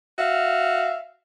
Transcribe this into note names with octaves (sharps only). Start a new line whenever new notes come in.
F#4 E5 F5